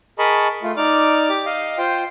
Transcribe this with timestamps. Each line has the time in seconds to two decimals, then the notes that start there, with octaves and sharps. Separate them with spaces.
0.19 G#4 A#4 D#5 A5 B5 C#6
0.63 A3 F4
0.77 D#4 D5 D6 F6
1.29 G4 D6
1.46 D#5 F5
1.78 F4 C5 G5